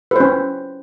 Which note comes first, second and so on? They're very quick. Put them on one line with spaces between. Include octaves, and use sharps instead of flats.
B4 C5 C#4